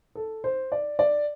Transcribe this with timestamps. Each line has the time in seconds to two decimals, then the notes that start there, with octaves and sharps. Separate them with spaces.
0.15 A4
0.44 C5
0.72 D5
0.99 D5